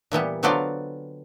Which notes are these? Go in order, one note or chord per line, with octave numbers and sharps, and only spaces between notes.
A#2 E3 G3 B3
D3 F#3 B3 C4 F4 D5